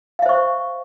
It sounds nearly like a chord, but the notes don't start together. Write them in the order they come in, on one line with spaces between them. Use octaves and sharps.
F5 E5 C5 C#6